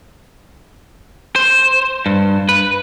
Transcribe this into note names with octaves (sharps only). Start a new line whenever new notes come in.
C5
G2
B4